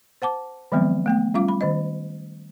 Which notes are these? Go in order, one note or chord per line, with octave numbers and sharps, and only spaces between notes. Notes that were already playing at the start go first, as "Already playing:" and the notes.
C5 F#5 A5 D6
D#3 F3 F#3 G#3 B3 C4
A3 B3 G5
G3 C#4 F4 F5 D6
B5
D#3 C5 D#5